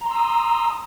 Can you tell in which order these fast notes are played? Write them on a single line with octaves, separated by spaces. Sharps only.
A#5 C6 E6 D#6